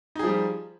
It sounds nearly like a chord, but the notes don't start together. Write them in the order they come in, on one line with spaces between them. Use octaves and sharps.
D#4 G#4 F3 G3